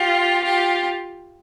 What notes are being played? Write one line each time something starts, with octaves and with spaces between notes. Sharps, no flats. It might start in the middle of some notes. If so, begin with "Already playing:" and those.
Already playing: F4 G4
F4 G4